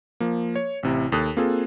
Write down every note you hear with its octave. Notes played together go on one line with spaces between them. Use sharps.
F3 A#3
C#5
A1 C3 E4
D#2 A4 D#6 F#6
A#3 C4 F4 G#4 A4